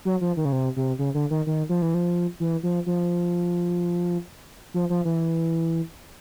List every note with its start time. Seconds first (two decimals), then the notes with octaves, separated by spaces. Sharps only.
0.05 F#3
0.21 F3
0.37 D#3
0.45 C#3
0.52 C3
0.76 C3
0.99 C#3
1.14 D3
1.30 D#3
1.47 D#3
1.69 F3
1.82 E3
1.94 F3
2.40 E3
2.63 F3
2.86 F3
4.74 F3
4.90 F3
5.05 E3